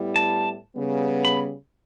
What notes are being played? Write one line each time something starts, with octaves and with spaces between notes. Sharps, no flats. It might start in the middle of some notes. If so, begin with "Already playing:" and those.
Already playing: A2 G3 B3 E4
A5
C#3 G3 B3
B5